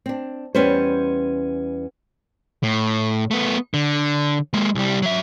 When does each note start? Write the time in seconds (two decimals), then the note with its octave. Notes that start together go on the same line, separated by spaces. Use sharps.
0.06 C4 D4
0.55 E2 G3 C#4 B4 C5
2.63 A2
3.31 A3 B3
3.74 D3
4.54 G#3 A#3
4.75 C2 G3
5.02 F#3 E5